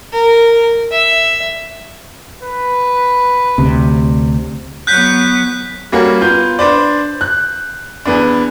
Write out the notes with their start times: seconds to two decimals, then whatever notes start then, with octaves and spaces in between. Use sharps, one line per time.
0.13 A#4
0.92 E5
2.42 B4
3.58 D2 C3
4.87 F#3 B3 F#6 G6 B6
5.92 G3 A#3 C#4 F#4
6.21 B3 F4 G6
6.59 D4 B4 C5 D5
7.21 F#6
8.05 E2 B3 D4